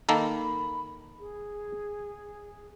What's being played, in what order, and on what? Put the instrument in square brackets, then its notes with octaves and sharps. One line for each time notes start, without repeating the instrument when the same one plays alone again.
[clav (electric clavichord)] D#3 A#3 A4 [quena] B5
[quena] G#4